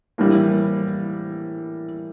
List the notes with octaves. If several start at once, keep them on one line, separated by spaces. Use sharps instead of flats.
A2 E3 G3 A#3